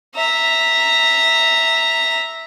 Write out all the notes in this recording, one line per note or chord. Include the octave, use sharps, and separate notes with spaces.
E5 A#5